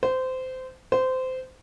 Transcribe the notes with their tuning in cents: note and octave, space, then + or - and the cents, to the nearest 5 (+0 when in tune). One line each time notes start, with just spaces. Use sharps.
C5 -20
C5 -20